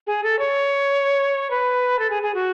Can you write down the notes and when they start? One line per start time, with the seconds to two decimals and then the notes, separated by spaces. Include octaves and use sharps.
0.07 G#4
0.23 A4
0.39 C#5
1.51 B4
1.99 A4
2.10 G#4
2.22 G#4
2.34 F#4